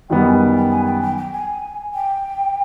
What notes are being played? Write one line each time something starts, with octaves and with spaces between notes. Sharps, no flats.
F#2 D#3 G3 B3 G5
G#5
G5
G5
G#5
G5
G5
G5
G#5
G5